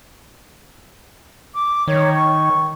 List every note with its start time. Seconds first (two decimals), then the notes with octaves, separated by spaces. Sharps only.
1.54 D6
1.87 D#3 C#5
2.15 C#6